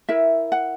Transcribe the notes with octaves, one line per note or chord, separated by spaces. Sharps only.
E4 A#4 E5
F#5